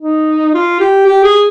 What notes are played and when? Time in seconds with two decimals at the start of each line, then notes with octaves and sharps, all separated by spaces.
0.01 D#4
0.54 F4
0.80 G4
1.06 G4
1.24 G#4